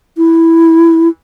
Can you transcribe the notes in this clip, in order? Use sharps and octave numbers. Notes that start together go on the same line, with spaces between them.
E4